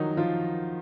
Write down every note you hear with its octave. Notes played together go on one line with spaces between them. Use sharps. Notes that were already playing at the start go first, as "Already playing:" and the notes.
Already playing: D#3 F3 F#3 D#4 F#4
F3 F4